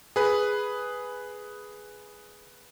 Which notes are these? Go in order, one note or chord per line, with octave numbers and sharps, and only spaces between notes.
G#4 B4